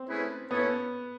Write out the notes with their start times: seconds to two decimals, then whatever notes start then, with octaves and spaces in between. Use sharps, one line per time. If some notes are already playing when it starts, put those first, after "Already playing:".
Already playing: C4
0.09 A3 C#4 E4 G#4 B4
0.51 A#3 B3 C#4 E4 A4 C#5